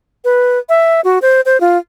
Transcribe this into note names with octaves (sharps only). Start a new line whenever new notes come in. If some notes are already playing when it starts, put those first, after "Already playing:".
B4
E5
F#4
C5
C5
F4